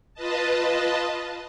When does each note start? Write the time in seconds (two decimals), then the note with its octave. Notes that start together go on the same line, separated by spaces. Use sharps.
0.14 F4 B4 D#5 A5